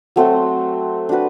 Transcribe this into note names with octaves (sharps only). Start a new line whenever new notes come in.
F#3 A3 C4 F#4
D4 F#4 B4